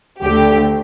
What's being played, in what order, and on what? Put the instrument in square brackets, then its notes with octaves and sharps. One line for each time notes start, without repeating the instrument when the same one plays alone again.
[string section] D2 D3 A3 G4